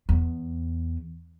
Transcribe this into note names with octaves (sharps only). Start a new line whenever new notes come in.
E2